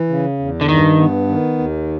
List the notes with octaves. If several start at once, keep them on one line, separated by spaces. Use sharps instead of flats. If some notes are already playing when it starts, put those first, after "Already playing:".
Already playing: E3
C#3
E2
D3
G2 D#3
B3
D#3
D#2